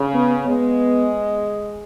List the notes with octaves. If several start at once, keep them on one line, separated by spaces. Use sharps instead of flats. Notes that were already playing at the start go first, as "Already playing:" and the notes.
Already playing: C#3
B3
G#3 B3